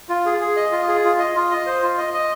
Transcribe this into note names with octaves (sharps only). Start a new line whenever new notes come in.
F4
G#4
G#4
D#5
F4
G#4
F4
D#5
F4
D#5
C5
F4
D#5
D#5